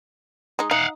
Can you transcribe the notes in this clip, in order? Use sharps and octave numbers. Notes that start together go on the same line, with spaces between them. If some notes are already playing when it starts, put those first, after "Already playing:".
G#3 D#4
D#4 F5 F#5